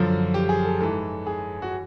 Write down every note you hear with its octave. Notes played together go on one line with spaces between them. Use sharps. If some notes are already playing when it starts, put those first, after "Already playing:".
Already playing: F#2 D3 F3
G4
G#4
A4
G#2 E3 A4
G#4
F#4